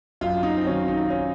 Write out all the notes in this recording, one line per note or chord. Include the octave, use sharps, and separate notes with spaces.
F#2 F4
D#4
C4
D#3 F#3 C#4
D#4
C#4